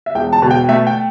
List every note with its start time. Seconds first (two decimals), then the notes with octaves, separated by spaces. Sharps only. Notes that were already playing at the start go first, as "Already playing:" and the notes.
0.06 E5
0.15 E1 G5
0.33 A5
0.42 B2
0.51 G5
0.69 A3 E5
0.87 G5